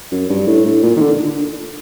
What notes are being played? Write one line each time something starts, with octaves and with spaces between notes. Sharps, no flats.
F#2
G2
A2
A2
A#2
D#3
D3